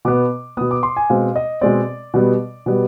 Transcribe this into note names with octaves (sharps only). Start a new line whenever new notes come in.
B2 B3 D6
B2 B3 D#6
D6
C6
G#5
B2 G#3 C4 F5
D#5
B2 G#3 C4 D5
B2 G3 B3
B2 G3 B3